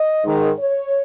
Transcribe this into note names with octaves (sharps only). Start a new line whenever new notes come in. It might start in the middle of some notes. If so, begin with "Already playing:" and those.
Already playing: D#5
G#2 D#3
C#5